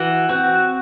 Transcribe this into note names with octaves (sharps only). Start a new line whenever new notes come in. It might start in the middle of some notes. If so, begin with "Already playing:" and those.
Already playing: E3 F#4
C4 F#4